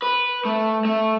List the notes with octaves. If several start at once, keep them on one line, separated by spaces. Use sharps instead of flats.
B4
A3
A3